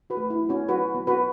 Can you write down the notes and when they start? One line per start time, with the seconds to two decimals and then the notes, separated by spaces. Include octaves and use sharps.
0.10 F#4 B4
0.17 A3
0.30 E4
0.43 F#3
0.49 C#4 F#4
0.69 F#3 F#4 B4
0.95 B3
1.07 F#4 B4